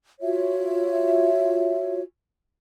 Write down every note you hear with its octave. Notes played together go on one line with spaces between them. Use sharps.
F4 F#4 C#5 E5